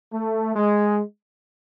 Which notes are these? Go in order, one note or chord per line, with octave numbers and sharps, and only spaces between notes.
A3
G#3